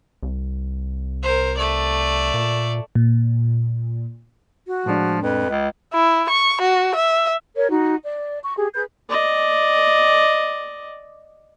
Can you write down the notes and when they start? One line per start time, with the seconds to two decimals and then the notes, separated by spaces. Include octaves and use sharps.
0.23 C2
1.22 A#4 C5
1.57 A3 D5
2.34 A#2
2.95 A#2
4.67 F#4
4.86 A2 F3 G#3 D4
5.22 F2 B4
5.49 C#2
5.94 E4
6.30 C#6
6.61 F#4
6.95 E5
7.55 A#4 C#5
7.69 D#4 F#4
8.03 D5
8.42 C#6
8.56 G4 G#4
8.74 G#4 B4 G6
9.09 D5 D#5